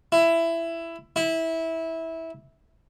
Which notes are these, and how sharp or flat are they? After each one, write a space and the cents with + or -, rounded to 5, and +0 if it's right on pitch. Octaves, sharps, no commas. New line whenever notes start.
E4 +15
E4 -15